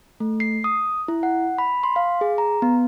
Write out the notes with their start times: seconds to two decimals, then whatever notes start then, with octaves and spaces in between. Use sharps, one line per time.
0.20 A3
0.40 C7
0.64 D#6
1.08 E4
1.23 F#5
1.58 B5
1.83 C6
1.96 F5
2.21 G#4
2.38 A#5
2.62 B3